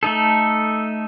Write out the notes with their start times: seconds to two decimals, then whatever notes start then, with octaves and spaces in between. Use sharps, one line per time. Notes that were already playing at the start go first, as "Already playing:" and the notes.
0.03 A3 D#4 A4